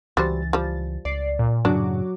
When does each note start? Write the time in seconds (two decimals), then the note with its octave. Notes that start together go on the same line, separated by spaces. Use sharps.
0.17 C#2 E3 G3 F#4 C5 A6
0.53 F3 G3
1.05 C#2 D5 C7
1.39 A#2
1.65 F#2 A2 C#3 F#3 D4 F#4 D6